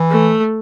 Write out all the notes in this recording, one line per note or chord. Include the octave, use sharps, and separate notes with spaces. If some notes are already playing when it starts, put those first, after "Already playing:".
Already playing: E3
A3